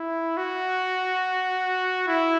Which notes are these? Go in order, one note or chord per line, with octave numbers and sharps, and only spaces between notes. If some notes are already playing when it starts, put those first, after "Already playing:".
Already playing: E4
F#4
E4